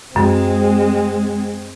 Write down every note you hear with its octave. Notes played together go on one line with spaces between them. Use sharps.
F#2 G#3 C4